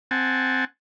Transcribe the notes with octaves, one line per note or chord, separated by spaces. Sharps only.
C4 F#5 G#5 A5